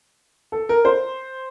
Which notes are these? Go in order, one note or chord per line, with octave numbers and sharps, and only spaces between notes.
A4
A#4
C5